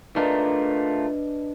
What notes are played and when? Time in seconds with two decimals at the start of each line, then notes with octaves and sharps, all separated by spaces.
0.16 A3 D4 F4 A#4 B4 D5 D#5